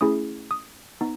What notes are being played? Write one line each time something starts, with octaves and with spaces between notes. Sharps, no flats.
A3 C#4 E4 G#4 D#6
D#6
B3 D#4